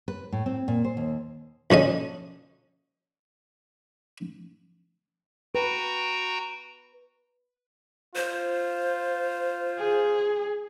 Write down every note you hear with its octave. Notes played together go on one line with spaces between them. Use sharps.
B4
A2
C4
A#2
C5
D#2
A#1 D3 C#4 D#5
F#4 B4 G5 A#5
F4 C5
G#4